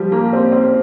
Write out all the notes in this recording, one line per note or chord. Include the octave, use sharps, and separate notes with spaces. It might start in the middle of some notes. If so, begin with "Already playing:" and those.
Already playing: F3 G3
A#3
C4
C4